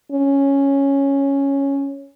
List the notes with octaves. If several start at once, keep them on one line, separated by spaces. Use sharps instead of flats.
C#4